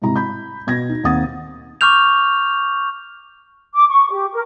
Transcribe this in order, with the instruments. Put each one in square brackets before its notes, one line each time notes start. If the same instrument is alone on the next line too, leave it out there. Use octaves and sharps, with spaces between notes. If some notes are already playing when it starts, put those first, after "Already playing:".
[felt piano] G#2 C3 E4 A#5
B5 G6
B2 G#6 A#6
D#4
D#2 C4 F#5 D#6 A6
[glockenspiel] C#6 D6 F6 G6 F7
[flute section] D6
C#6
G4
A#4